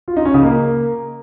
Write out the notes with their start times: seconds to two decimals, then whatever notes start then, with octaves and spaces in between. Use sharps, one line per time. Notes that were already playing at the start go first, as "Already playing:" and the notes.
0.08 F4
0.16 D#4
0.25 C#4
0.34 C#3
0.43 A#3